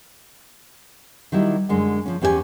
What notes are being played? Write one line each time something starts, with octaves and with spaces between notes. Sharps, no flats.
D#3 F#3 G3 E4
F#2 D3 G#3
F3 C#4
E2 C#4 G4 D#5 G#5